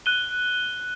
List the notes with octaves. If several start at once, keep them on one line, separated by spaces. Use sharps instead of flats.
F#6 D#7 G7